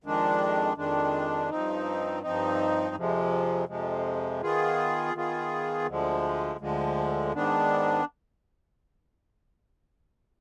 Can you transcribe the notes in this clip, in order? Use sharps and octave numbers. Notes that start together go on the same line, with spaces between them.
F2 D#3 G#3 D4
F2 D#3 G#3 D4
G2 F3 C4 D#4
G2 F3 C4 D#4
F2 C3 F3 G#3
F2 C3 F3 G#3
D#3 B3 F4 G#4
D#3 B3 F4 G#4
D2 D3 F3 G#3
D2 D3 F3 G#3
G#2 D#3 B3 D4